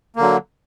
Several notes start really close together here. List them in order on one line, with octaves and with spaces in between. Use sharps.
A#3 D3 F#3